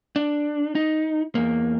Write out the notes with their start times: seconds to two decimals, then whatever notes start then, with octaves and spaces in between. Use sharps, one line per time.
0.16 D4
0.75 D#4
1.35 E2 A#3